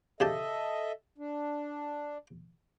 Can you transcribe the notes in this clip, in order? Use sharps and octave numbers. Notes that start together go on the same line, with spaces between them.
C#3 G4 A4 D#5 E5 A5
D4